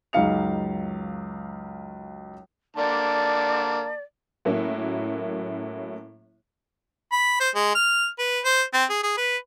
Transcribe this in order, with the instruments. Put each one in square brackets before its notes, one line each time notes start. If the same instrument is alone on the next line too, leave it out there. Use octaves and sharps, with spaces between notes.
[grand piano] C#2 F#2 D#4 F5 C#7 F7
[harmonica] D3 A#3 A5 [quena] D5
[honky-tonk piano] A2 F#3 A#3 C#4 E4
[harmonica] B5
C5
G#3
F6
B4
C5
C4
G#4
G#4
B4